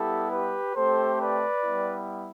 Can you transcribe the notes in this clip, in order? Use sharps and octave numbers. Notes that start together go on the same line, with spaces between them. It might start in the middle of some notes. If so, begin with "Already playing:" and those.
Already playing: G3 B3 E4 G4 A4
G4 B4
A3 C4 G4 A4 C5
B4 D5
G3 B3 E4